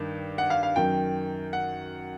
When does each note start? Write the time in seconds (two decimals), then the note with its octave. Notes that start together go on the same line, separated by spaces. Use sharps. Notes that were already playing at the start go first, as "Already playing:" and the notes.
Already playing: G2 D#3
0.38 F#5
0.50 F5
0.63 F5
0.76 F#2 D#3 G5
1.53 F#5